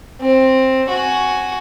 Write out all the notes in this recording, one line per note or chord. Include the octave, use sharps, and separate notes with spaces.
C4
F#4 G#5